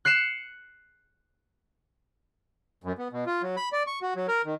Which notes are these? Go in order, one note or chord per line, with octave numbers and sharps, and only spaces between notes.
F#6 C7 C#7 E7
F#2
B3
B2
F4
F#3
B5
D5
C#6
F#4
F#3
A#4
D#3